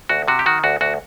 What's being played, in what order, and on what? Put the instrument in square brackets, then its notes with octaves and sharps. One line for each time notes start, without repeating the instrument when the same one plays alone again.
[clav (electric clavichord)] D2 F#4
C3 F#4
G4
D#3 F#4
D2 F#4
D2 F#4